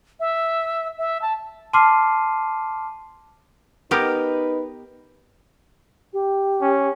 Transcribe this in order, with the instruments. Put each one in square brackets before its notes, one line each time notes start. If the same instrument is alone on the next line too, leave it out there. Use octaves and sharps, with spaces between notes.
[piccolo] E5
E5
A5
[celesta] A5 C6 D6 F6 C7 D#7
[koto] B3 G4 A#4 [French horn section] D#4 B4
[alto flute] G4
[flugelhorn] C#4